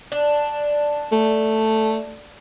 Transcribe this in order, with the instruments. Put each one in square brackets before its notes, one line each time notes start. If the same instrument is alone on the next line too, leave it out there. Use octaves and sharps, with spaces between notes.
[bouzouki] D4
[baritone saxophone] A3